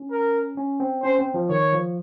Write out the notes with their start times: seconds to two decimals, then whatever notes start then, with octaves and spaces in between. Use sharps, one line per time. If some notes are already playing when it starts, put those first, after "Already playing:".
Already playing: C#4
0.11 A#4
0.57 C#4
0.80 C4
1.03 C#4 C5
1.19 C4
1.34 F3
1.49 D#3 C#5
1.72 F3